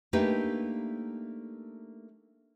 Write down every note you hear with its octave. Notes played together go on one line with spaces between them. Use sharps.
A3 A#3 D4 D#4 G4 B4